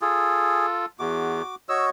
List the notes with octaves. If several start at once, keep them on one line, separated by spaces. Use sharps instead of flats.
F4 G#4 A4
E2 F#4 D6
F#4 C#5 D#5 E6